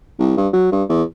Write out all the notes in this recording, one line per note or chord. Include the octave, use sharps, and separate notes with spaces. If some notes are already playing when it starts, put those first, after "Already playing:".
C2
G2
F#3
G2
E2